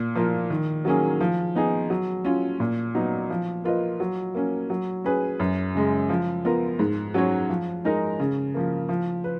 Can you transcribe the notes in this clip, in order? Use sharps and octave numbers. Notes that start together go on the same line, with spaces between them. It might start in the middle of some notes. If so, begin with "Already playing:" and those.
Already playing: A#2
F3 A#3 F4 A#4
D#3
F#3 A#3 C#4 G#4
F3
B3 D#4 G#4
F#3
C#4 F4
A#2
F#3 B3 D#4
F3
A#3 F4 B4 D#5
F#3
A#3 C#4
F#3
C#4 G#4 B4
F#2
C#3 G#3
F3
B3 F4 A#4
G#2
F#3 C#4 F#4 C#5
F3
G#3 D#4 A#4
C#3
F3 A#3
F3
B4